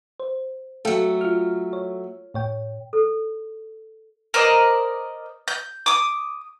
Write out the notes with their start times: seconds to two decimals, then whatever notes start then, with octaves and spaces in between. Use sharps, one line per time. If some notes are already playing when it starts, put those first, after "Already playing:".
0.20 C5
0.85 F#3 A3 A4 F5 G5
1.21 F4 F6
1.73 C#5
2.34 A2 C#5 G5
2.93 A4
4.34 A#4 C5 D5 D#5
5.48 G6
5.86 D6 D#6